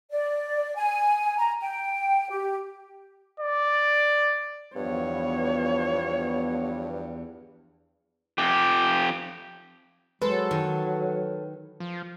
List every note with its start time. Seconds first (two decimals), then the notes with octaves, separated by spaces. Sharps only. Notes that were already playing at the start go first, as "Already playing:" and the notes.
0.11 D5
0.76 G#5
1.38 A#5
1.61 G5
2.30 G4
3.40 D5
4.76 E2 G2 F3 B3 C#5
8.38 F2 G4
10.22 F#3 G#3 A4 B4 C5
10.51 D#3
11.80 F3